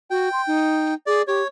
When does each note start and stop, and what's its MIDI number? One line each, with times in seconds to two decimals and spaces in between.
0.10 0.29 66
0.10 0.94 79
0.33 0.42 84
0.47 0.94 63
1.07 1.22 68
1.07 1.22 74
1.27 1.42 67
1.27 1.48 73